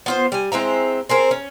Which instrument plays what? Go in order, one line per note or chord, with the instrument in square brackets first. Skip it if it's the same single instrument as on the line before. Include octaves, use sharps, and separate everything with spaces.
[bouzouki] B3 F4 C5
G3 G#5
G#3 C4 E4 A#5
C4 G#4 A#4 C5
C#4